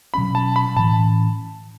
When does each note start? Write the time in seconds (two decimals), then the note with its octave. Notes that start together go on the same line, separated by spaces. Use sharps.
0.14 B2 F#3 C#4 B5
0.35 A5
0.56 B5
0.76 A2 E3 C#4 A5